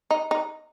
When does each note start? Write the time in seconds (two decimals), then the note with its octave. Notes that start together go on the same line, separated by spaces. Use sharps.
0.11 D#4
0.31 D#4